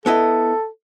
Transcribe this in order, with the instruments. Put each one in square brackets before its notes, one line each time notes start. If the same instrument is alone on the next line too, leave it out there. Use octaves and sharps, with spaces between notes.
[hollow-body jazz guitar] B3 E4 D#5 [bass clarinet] A4